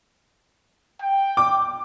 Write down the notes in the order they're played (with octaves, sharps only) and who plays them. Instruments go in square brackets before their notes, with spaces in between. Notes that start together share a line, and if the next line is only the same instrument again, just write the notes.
[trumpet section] G5
[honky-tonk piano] D6